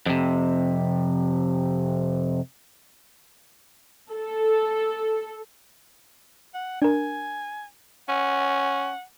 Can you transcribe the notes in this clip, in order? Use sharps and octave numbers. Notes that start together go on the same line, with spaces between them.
F2 C3
A4
F#5
D4 A#4 G#5
C#4 F#5